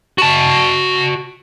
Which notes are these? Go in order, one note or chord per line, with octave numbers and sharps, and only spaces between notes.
F#4 A5